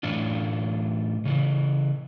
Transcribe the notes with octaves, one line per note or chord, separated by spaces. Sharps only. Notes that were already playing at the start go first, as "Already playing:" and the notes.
A2 E3 D4 F4
C#3 E3